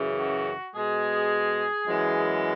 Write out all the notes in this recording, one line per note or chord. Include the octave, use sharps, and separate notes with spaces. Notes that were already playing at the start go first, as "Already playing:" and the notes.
Already playing: F#2 C#3 E3
F#4
B2 G#3 G#4
F#2 E3 G#3